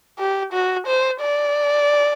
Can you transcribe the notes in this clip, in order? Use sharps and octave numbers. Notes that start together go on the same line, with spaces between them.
G4
F#4
C5
D5